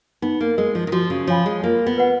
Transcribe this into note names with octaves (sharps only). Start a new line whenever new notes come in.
B3 D#4
A#3
G#3 A#4 D#5
F3
D#3
F3 F#4
C#3
F3 C#5 F5 G#5 B5
G#3
A#3 F4
B3
B4 F#5